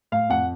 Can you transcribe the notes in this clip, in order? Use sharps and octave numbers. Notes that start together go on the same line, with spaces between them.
A2 F5
F2 F#5